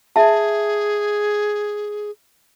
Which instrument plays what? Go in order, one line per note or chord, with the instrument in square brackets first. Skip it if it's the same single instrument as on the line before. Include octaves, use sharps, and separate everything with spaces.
[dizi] G#4 [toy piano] E5 A5